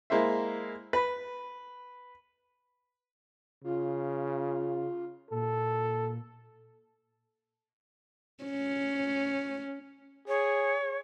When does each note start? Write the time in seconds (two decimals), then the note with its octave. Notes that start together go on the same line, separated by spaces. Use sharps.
0.10 G#3 A#3 E4 C5 E5
0.93 B4
3.64 C#3 F4
5.31 A#2 A4
8.44 C#4
10.28 G#4 C#5